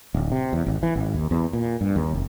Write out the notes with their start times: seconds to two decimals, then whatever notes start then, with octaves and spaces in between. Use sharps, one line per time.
0.14 D1
0.32 C3
0.53 E2
0.66 G#1
0.83 E3
0.95 G#1
1.14 D#2
1.31 E2
1.53 A#2
1.81 G2
1.96 D#2
2.13 F1